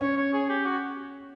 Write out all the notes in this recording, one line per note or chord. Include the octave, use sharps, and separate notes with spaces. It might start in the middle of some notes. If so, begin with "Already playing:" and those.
C#4 C#5
C#5
G#4
G4
F#4